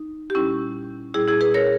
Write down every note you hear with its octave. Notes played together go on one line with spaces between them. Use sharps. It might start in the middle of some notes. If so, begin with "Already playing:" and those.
Already playing: D#4
G4
A#2 G3 C#4 E4
A#2 G3 E4 G#4
E4 G#4
G#4 B4
A#4 C#5